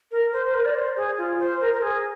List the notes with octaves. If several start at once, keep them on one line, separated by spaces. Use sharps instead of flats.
A#4
C5
C5
A#4
D5
C5
G#4
F4
C5
A#4
A#4
G#4